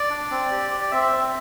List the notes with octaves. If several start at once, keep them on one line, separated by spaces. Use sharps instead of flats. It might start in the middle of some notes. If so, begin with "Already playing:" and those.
Already playing: D5
D4
C4
G4
G4
D5
C4 E5
C4